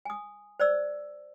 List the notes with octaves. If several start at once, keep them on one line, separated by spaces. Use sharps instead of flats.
G#5 D#6
C5 D5 E6